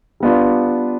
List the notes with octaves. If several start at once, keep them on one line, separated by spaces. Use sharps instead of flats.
G3 B3 D4 F4